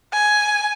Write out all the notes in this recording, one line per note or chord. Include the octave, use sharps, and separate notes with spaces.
G#5